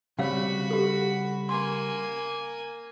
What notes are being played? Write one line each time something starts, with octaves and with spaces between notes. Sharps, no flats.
C#3 G3 C4 F#4 C#5 F5 F#5 B5
G4 A4
A#3 G#5 C6